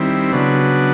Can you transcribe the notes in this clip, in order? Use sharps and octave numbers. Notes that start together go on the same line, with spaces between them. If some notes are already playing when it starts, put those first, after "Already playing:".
Already playing: D#3 G3 C4 E4
C#3 F#3 B3 D4